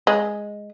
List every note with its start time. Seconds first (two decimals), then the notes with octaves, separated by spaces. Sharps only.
0.07 G#3